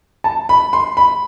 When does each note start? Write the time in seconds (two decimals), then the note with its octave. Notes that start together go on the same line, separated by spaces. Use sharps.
0.24 A5
0.49 B5
0.73 C6
0.97 B5